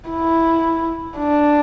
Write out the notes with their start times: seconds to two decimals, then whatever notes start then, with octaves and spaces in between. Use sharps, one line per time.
0.10 E4
1.18 D4